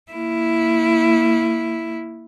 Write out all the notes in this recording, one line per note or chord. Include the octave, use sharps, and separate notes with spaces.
A#3 E4